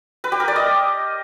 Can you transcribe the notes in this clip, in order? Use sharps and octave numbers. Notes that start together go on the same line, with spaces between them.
B4
G4
A#4
D5
D#5